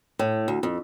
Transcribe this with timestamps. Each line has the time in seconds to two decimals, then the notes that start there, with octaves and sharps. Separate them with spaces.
0.19 A2
0.48 D2
0.63 F2